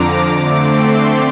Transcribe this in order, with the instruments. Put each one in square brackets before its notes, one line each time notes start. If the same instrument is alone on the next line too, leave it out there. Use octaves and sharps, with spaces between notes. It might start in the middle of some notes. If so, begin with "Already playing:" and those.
Already playing: [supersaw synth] F2 D3 F3 A#5 D6
D3 A3 C4 D6
C6
D6